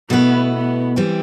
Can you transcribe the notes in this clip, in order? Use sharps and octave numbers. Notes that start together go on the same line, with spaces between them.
B2 A3 B3 E4 B4
B3
E3 G3 C4 E4